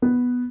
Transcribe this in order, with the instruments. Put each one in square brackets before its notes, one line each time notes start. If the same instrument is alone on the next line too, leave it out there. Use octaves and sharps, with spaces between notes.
[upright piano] B3